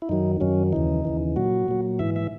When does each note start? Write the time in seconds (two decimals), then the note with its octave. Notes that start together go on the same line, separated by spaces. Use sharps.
0.02 E4
0.09 F#2 D#3 F#3 D#4
0.40 F#2 D#3 F#3 C#4
0.73 D#2 C#3 E3 D#4
1.05 D#2 C#3 E3
1.36 A#2 F#3 F#4
1.68 A#2 F#3
1.99 G#2 E3 E5
2.16 E5